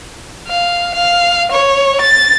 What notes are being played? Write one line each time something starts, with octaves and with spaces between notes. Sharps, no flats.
F5
F5
C#5
A6